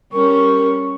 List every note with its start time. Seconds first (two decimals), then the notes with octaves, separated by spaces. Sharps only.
0.13 G3 C#4 A#4 C#6